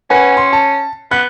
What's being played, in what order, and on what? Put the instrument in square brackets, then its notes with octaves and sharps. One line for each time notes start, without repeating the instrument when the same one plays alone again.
[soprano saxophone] C#4 [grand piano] B4 F#5 G#5
[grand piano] C6
A5
[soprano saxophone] B3 [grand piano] F#6